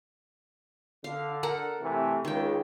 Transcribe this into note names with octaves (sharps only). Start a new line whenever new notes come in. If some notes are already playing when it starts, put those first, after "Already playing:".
D3 F5
A4 A#4 F#5
C3 E3 A3
C#2 D#3 G5